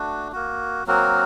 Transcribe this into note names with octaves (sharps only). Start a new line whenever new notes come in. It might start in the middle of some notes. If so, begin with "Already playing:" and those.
Already playing: A3 D4 F#4
A#3 F#4
F#3 A#3 C4 F#4 A#4